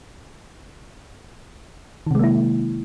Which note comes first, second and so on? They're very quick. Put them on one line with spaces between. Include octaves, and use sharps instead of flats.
D#3 C3 G#3 A#3 E4